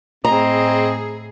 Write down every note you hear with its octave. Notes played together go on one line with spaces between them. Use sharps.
A2 C4 G#4 D#5 A#5